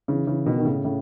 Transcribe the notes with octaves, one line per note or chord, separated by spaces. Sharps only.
C#3 E3
C#3 E3
B2 D#3
D#3
A2 C#3
A2 C#3